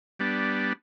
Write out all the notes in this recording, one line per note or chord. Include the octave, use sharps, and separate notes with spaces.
G3 B3 D4